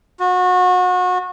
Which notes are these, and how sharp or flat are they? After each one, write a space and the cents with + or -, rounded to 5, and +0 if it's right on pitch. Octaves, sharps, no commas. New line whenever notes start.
F#4 -30